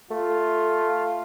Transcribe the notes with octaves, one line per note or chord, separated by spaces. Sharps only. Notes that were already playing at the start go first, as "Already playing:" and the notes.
A3 F4